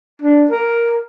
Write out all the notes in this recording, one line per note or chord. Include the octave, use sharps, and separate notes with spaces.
D4
A#4